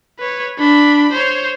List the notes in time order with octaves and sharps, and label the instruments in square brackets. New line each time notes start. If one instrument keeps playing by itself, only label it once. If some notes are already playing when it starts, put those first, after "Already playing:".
[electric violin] B4 C#5
D4 B5
C5 C#5